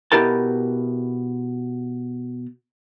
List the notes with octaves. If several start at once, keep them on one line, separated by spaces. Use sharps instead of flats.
B2 E4 G4 A#4 A5